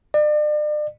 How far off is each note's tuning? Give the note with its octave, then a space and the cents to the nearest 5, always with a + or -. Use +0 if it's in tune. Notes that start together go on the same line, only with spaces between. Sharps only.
D5 +40